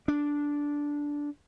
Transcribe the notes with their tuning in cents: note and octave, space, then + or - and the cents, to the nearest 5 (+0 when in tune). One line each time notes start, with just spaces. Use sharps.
D4 -10